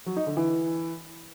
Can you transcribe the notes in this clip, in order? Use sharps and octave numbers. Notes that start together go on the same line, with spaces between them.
F#3
D#4
D3
E3